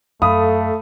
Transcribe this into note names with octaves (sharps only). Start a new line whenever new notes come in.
F#2 F#3 A3 A4 F5 B5 D#6